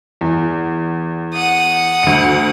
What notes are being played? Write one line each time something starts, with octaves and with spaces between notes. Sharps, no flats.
E2
F#5 D#6
D2 C#7